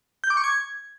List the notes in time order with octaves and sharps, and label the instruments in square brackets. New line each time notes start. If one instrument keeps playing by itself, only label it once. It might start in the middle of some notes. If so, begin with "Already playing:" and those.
[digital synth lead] G6
D6
C#6
G#6